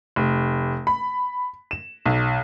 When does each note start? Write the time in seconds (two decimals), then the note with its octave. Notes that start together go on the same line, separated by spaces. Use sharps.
0.16 F1
0.87 B5
1.71 E7
2.06 B1